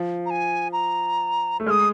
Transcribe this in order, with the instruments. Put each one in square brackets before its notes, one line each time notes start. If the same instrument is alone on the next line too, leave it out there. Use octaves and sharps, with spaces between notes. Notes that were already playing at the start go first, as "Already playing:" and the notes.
Already playing: [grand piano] F3
[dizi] A#5
G#5
A#5
[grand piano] A3
[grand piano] G#3 [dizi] F6
[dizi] D#6